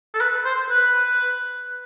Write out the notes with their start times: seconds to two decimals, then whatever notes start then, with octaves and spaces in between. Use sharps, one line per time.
0.14 A4
0.21 B4
0.45 C5
0.70 B4